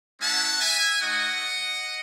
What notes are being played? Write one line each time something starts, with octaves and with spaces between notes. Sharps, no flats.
G#3 C#4 E4 F#5 A5
E5 G#5
A3 D#4 F#4 D#5 F#5